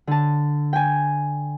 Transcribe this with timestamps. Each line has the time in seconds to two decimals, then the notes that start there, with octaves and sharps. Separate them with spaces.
0.07 D3 A5
0.73 G5 G#5